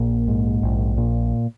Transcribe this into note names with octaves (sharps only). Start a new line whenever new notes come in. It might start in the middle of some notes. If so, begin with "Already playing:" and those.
Already playing: A#1 A#2 A#3
G#2
A#1
A#2